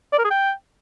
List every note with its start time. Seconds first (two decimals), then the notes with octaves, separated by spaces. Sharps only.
0.13 D5
0.19 A#4
0.25 G#4
0.31 G5